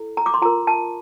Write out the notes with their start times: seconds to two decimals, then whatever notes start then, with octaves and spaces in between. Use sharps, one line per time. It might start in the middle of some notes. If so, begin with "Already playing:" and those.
Already playing: E4 A4
0.17 A#5
0.26 D6
0.34 C6
0.42 F4 A#4 A#5
0.67 A5